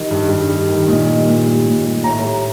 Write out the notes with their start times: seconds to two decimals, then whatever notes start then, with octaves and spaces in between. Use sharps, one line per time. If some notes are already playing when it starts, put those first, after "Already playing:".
Already playing: D#3 G3 D#5
0.11 G2
0.29 G2
0.50 G3
0.68 D#3
0.88 A#2 D#5
1.06 G3
1.26 A#2
1.46 G3
1.66 A#2
1.85 G3
2.04 A2 A#5
2.23 G3